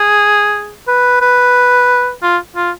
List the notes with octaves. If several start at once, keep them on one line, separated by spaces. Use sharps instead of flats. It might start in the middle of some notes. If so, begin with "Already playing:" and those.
Already playing: G#4
B4
B4
F4
F4